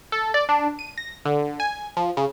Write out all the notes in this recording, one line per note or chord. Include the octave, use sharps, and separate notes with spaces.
A4
D5
D4
D#7
A#6
D3
G#5
F3
C#3